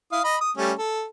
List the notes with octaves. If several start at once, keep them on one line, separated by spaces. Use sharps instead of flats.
E4 F5 D#6
D#5 B5
D#6
G3 A3 C#4
A4